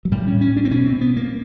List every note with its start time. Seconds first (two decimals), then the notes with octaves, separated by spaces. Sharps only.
0.05 F#3
0.11 A2 G3
0.27 C#4
0.41 C#4
0.57 D4
0.65 C4
0.71 B2 C#4
0.86 C4
1.01 B3
1.17 A#3